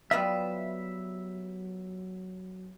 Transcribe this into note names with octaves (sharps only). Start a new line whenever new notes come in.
F#3 G3 B3 F4 E5